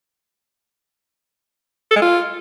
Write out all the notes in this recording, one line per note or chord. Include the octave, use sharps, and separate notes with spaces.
A4
G#3
F4